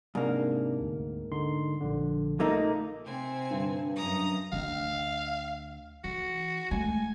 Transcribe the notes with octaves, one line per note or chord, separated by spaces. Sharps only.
G#2 C3 A#3 D4
D2
D3 D#4 C6
A#1 D3
A#2 A3 A#3 D#4 A#5
C3 C4 G#5
G2 D3
F#2 A#5 D#6
D2 D3 F5
E3 F#4
G#3 A3 G#5